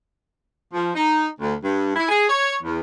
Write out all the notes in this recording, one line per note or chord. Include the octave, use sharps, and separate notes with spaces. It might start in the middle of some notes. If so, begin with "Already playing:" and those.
F3
D#4
D2
G2
E4
G#4
C#5
E2